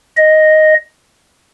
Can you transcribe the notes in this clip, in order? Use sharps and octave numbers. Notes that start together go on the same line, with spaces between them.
D#5